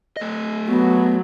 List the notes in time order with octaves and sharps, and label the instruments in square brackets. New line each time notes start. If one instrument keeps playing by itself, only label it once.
[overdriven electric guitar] A3 D#5
[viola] F#3 [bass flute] B3